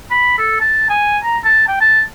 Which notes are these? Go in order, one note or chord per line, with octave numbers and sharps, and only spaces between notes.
B5
A4
A5
G#5
A#5
A5
G5
A5